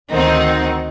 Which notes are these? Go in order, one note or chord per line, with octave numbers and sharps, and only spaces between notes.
D2 D#3 C4 D#4 F#5